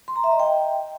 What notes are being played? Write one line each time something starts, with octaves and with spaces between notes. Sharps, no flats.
C6
A#5
E5
D#5
G5